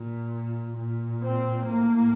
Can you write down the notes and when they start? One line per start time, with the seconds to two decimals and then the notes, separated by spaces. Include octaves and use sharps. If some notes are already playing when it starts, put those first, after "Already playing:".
Already playing: A#2
0.76 A#2
1.22 C4
1.67 A2 A#3